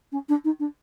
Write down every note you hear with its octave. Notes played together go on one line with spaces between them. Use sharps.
C#4
D4
D#4
D4